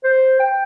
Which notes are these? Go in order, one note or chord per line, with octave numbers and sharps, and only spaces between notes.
C5
G5